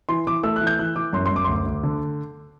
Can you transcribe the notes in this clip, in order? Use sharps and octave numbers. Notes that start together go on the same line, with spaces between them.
E3 C6
E3 D6
A3 E6
F#6
E3
G6
E3 F#6
E3 D6
F#2 C6
C6
F#2 D6
C6
D2 D6
D2
D3